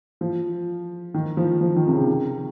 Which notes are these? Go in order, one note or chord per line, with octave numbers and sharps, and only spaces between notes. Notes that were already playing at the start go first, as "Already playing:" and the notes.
F3
D#3
F3
F3
D#3
C3
C#3
D#3